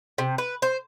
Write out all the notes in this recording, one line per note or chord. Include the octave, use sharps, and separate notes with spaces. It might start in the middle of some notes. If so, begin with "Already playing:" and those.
C3
B4
C5